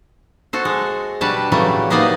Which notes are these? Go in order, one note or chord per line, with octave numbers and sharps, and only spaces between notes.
F#4 A4 C5
G#3
B2 G3 D4 F#4 B4 A5
A2 C#3 E3 F#3 G3 A3
A#3 B3 D#4 C5 D5 D#5